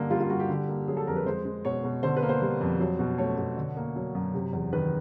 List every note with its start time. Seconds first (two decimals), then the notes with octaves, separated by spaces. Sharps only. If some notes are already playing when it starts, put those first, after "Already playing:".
Already playing: G2 D3 A#3
0.10 G3 F4
0.20 F4
0.30 G2 F#4
0.40 G4
0.49 D3
0.69 A#3
0.88 F#3 G#4
0.97 A4
1.07 F2 A#4
1.16 B4
1.26 G#3 C5
1.45 G#3
1.65 B2 C#5
1.84 B2
2.03 D3 C5
2.17 B4
2.23 A#3
2.29 C5
2.42 G3
2.61 F2
2.80 F#3
2.99 B2
3.18 A3 C#5
3.38 B2
3.57 D3
3.77 A#3
3.96 F#3
4.15 F#2
4.34 C3
4.53 E2
4.73 D#3 B4